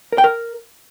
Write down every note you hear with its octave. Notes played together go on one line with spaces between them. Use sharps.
A#4
G5
A#4